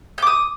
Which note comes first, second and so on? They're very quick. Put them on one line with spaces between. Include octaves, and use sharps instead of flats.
G6 D6 D#6